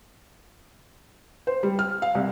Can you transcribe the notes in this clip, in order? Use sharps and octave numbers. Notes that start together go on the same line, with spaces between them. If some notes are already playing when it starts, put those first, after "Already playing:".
C5
G3
F6
F5
C2